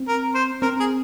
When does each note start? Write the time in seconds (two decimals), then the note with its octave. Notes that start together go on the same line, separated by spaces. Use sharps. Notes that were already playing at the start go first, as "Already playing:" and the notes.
Already playing: C4
0.08 A#4
0.35 C5
0.62 C4 A#4
0.80 G#4